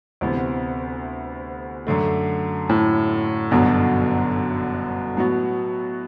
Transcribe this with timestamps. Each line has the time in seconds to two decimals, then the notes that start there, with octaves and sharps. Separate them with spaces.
0.21 D2 C3 E3 B3
1.87 F#2 D3 A3
2.70 A2
3.51 G1 F#2 B2 D3 F#3
5.17 A2 F#3 B3 F#4